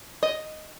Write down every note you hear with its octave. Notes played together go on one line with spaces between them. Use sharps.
D#5